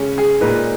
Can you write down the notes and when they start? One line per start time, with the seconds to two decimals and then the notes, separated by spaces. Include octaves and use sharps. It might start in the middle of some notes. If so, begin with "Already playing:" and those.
Already playing: C#3 G#3 C#4
0.18 G#4
0.41 A#2 G#3 D#4 B4